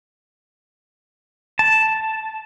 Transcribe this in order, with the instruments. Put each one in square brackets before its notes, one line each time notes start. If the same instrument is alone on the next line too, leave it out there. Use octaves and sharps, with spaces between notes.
[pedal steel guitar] A5